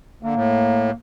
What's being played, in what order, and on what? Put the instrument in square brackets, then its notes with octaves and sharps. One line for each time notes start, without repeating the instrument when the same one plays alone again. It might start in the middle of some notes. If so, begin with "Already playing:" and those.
[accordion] D3 [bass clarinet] A#3
[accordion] A2